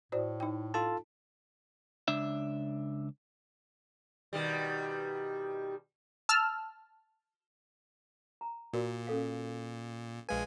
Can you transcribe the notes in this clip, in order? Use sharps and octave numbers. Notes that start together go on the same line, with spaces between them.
A2 F#4 C5 D5
D#4 G5
F4 A4 A5
C#2 D4 E5
B2 D#3 G3
A5 E6 F6
A#5
A#2 F#4 A#4 D5
C#4 A4 F5
A#1 G#3 B4 F5 G#5